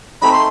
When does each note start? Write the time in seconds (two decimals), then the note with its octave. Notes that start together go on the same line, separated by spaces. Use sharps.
0.22 A3 C4 D#4 B5
0.32 C6